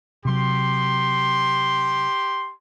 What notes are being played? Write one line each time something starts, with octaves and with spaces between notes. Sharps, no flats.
C3 F#3 G4 C6